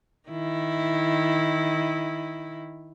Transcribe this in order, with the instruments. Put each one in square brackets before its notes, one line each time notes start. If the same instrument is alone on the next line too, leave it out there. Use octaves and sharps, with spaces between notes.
[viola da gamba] D#3 E4